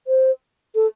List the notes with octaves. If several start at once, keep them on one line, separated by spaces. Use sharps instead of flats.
C5
A4